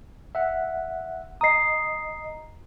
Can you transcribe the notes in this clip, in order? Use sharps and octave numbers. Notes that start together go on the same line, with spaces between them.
E5 F#5
D#5 A#5 D#6 C7